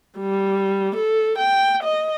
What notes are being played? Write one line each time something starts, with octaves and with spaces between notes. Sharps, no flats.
G3
A4
G5
D#5